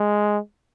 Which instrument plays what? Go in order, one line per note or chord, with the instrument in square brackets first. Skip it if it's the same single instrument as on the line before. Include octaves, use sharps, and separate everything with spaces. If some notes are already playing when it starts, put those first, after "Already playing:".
Already playing: [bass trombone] G#3